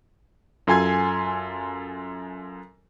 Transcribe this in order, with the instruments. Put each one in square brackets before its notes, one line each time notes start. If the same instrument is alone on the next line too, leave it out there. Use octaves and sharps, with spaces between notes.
[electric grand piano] F#2 F4 A4 G#5 C6 G#6